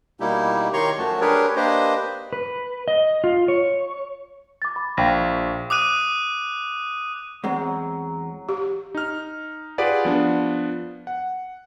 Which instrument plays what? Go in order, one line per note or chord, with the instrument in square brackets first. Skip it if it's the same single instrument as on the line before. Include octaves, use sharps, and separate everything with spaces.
[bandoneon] B2 G3 A#3 D#4 E4 G4
D#3 G4 C#5 A#5 C6 C#6
F#2 F3 A3 F#4 A5
D4 G4 G#4 A#4 B4 C#5
A#3 D4 G4 B4 C5 D#5
[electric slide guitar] B4
D#5
F4
C#5
[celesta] D6 A6
B5
[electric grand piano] A#1 [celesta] F5 G5 A#6
[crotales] D6 D#6 F#6 D#7
[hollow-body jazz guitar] E2 G#3 C4 [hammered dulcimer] F#3
[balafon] G4
[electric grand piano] D#4 F6
F4 G4 G#4 B4 D5 F#5
F3 B3 D4
F#5